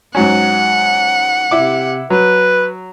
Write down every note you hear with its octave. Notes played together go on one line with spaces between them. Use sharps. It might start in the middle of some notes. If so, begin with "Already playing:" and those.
G#2 F#3 C#4 F#5
C3 E4 D6
F#3 B4